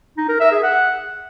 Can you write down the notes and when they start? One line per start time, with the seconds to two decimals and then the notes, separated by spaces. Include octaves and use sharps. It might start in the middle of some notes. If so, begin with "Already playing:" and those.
0.17 D#4
0.29 A#4
0.40 E5
0.52 G#4
0.63 F#5